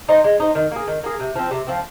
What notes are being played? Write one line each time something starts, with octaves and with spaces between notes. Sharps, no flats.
D#4 C5
G#3
D#4 C5
D#3
A#3 G#4
D#3
A#3 G#4
C3
F3 C4
C3
F3 C4